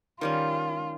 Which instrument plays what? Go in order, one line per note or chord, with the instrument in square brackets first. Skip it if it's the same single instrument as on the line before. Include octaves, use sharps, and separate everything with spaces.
[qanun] D#3 G3 C#4 [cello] F4